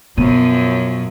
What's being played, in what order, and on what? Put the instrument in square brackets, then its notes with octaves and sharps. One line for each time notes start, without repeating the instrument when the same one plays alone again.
[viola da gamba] F#2 F3 F#3 [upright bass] B2 [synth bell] B3 D#7